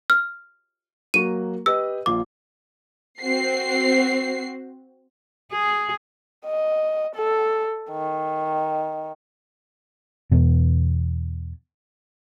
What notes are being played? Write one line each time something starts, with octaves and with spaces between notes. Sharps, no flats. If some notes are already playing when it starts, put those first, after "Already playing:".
F6
F#3 A#3 F#4 D#7
G4 B4 D#5 E6
A#1 F4 D6
C4 F#4 C7
G#4
D#5
A4
D#3
E2 B2